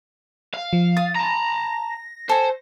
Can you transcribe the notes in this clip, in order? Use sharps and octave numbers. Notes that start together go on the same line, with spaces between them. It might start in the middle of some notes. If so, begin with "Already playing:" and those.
F5
F3
D#6 A6
A5 A#5 A#6
A4 C5 G#5